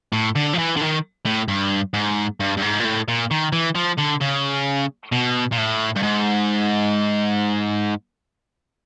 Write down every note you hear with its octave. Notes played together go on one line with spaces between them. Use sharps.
A2
D3
F3
E3
D3
D#3
A2
G2
G#2
G2
G2
G#2
A#2
A2
A#2
D#3
E3
F3
D3
C#3
B2
A#2
A2
G2
G#2